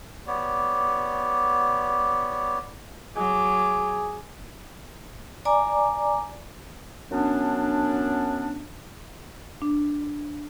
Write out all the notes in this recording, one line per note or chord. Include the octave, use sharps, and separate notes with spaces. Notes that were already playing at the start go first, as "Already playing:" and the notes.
B3 G4 C#5 D5
F#3 G#4 D6
D5 G#5 A#5 D6
F#2 B3 C#4 D4
D4